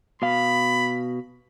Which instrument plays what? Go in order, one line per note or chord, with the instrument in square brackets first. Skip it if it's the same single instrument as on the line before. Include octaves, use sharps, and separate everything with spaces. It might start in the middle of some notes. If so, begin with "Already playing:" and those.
[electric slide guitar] B2 F5 [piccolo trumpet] B5